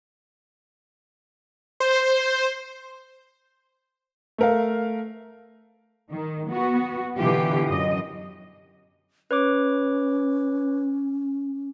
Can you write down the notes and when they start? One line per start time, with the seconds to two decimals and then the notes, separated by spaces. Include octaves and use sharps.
1.80 C5
4.38 A3 A#4 F5
6.10 D#3
6.48 B3 F#4
7.17 B2 D3 E3 F4 G4
7.67 F#2 D#5
9.31 C#4 B4 C#5 D6